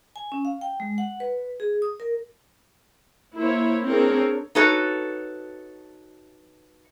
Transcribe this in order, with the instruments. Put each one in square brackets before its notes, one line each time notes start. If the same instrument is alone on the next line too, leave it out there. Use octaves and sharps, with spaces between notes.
[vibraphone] G#5
C#4
F5
G5
G#3
F#5
B4
G#4
D#6
A#4
[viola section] A#3 E4 C5 C#5
C4 D4 G#4 A#4 C#5
[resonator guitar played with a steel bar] D#4 F#4 A4 B4 C#5